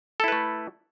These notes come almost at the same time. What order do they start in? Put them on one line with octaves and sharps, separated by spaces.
A4 E4 B4 A3